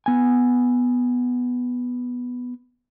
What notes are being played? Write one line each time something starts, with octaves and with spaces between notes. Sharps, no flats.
B3 G#5